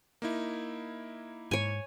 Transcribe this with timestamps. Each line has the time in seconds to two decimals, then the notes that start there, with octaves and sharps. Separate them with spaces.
0.22 A#3 D#4 E4
1.51 G#2 C#5 G#5